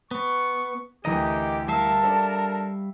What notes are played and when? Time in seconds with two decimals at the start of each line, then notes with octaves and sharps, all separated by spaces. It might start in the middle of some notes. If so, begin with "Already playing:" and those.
0.11 B3 C#6
1.05 D2 E3 G4 A#4 D#5 G5
1.68 G3 A#4 E5 F5 A5
2.03 D4 A4